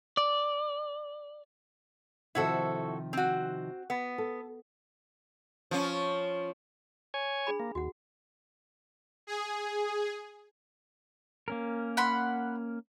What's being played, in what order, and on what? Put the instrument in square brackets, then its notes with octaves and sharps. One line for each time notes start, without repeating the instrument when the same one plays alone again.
[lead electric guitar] D5
[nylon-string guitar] C3 D#3 F3 [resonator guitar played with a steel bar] E4 F#4 A4
[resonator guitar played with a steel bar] C4 F#4
B3
[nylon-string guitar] A4
[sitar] F3 C#4
[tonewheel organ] C#5 G#5
[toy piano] D4 G#4 B5
[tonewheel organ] A#3
[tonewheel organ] D#2 [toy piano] F#4 F#5
[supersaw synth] G#4
[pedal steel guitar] A#3 C#4 A#4
[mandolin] F#5 B5 C6